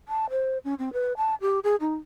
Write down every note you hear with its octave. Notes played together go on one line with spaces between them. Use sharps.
A5
C5
C#4
C4
B4
A5
G4
G#4
D#4